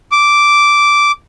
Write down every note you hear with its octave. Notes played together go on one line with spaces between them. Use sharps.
D6